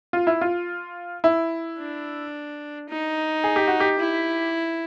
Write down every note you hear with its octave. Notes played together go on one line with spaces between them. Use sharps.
F4
E4
F4
E4
D4
D#4
G#4
G4
F#4
G4
E4